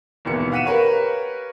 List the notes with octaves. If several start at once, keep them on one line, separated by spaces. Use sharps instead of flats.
G#1 D#2 B2 E3 C#7
F5 F#5 F#6 B6 D#7 E7
G4 A#4 B4 C#5 F5